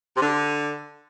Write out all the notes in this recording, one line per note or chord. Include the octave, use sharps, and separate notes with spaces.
C3
D3